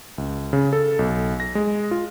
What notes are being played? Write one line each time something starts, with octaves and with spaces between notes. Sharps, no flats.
C#2
C#3
A4
B1
A#6
G#3
F4